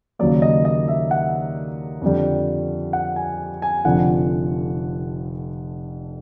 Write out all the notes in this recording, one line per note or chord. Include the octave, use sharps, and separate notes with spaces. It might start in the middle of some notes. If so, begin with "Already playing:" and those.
D#2 C#3 F#3 A#3 D5
D#5
D#5
E5
F#5
F2 D3 G3
F#5
G#5
G#5
F1 F2 D3 F3 F#5